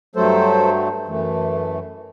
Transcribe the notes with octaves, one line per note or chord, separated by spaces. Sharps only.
G2 F#3 A3 A4 C5
F#2 E3 A3